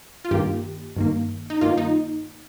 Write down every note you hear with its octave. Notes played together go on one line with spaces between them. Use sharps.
F4
G2 D#3 A#3 G4
G2 D#3 A#3
D#4
G2 D#3 A#3 F4
D#4